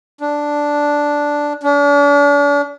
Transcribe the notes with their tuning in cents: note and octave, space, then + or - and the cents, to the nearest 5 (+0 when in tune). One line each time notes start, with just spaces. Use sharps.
D4 -5
D4 -40